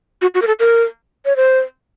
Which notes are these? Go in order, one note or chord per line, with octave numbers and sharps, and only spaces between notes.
F#4
F#4
A#4
A4
A#4
C#5
C5